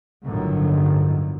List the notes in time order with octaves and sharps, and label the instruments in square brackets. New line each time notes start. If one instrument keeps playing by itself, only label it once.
[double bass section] G1 A2 D3 D#3 F3 F#3